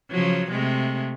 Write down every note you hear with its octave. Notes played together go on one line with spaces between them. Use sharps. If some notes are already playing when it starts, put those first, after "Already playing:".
C#3 F3 F#3
C3 G#3 A3